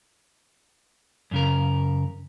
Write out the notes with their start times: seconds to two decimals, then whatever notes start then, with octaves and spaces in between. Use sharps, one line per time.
1.31 F#2 C#3 A#4